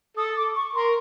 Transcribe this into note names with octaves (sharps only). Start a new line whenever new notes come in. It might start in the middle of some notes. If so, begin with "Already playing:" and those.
A4 D#6
D6
C#6
A#4 C6